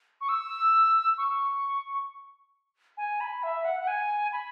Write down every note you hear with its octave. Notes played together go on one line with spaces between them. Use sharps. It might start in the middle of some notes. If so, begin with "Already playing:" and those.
C#6
E6
C#6
G#5
B5
E5
F#5
F#5
G#5
B5